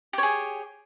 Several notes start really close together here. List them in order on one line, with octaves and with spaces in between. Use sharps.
G4 C#5 G#4